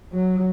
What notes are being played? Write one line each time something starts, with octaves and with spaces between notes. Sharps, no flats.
F#3